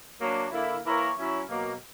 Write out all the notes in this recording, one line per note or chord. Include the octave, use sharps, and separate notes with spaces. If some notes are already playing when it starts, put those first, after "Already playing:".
F#3 A#3 D4
D3 A#3 E4
E3 A#3 E4 A#4 C#5
F#3 C#4 E4
B2 F#3 A#3